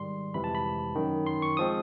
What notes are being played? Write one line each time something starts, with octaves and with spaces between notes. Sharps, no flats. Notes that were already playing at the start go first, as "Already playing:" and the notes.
Already playing: G#2 D#3 G3 C6
G1 F2 C3 E3 G#3 B5
A5
B5
G#1 F#2 D#3
C6
C#6
F3 G#3 C4 D#6